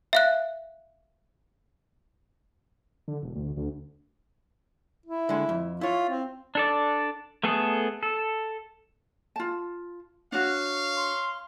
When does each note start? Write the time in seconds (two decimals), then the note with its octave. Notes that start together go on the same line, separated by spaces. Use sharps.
0.13 E5 F5 F#6
3.08 D3
3.23 E1
3.35 D2
3.57 D2
5.06 E4
5.29 D3 G#3 F#5
5.49 F2
5.81 E4 F4 C#5
6.09 C4
6.55 D4 A4 D5
7.44 A3 B3 G#4 A4
8.03 A4
9.36 F4 A5
10.32 D4 F#4 C#5 F5
10.97 C6